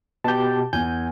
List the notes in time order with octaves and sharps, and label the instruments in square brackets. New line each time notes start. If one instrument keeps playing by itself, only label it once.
[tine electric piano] B2 G4 [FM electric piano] A5 G6
[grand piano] E2 [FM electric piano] G#5 [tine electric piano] G6